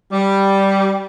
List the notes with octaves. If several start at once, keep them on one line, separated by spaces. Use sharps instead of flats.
G3